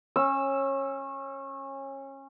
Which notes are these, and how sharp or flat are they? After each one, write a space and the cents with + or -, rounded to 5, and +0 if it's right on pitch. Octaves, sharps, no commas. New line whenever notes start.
C#4 -25 E6 +0